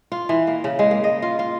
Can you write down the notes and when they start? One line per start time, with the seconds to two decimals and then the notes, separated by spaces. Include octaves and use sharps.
0.12 F4
0.29 E3
0.47 A#3
0.64 C#3
0.79 G#3
0.91 A#3
1.04 D#5
1.22 F4
1.39 F4